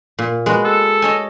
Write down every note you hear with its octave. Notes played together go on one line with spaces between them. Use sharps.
A#2
G#3 B3 F#4
A4
C#5 D#5 G#5